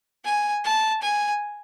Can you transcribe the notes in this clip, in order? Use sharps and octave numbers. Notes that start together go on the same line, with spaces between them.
G#5
A5
G#5